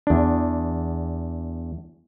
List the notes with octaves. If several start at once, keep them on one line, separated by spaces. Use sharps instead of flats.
E2 D4